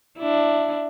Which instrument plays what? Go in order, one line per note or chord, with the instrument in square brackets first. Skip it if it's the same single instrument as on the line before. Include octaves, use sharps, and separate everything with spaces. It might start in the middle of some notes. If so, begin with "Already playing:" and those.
[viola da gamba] D4 E4